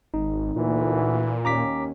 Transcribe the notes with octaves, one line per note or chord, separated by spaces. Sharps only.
G#1 D#4
D2 A#2 E3
D#2 C#4 A#5 D6 B6